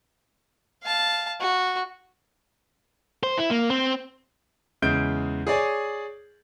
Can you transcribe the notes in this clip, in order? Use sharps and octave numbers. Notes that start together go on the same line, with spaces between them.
F5 A5
F#4
C5
E4
A#3
C4
E2 C#3 G#3 G6 D7
G#4 C#5 D5 G#5